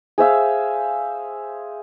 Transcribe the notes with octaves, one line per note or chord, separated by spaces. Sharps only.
G#4 C5 E5 F5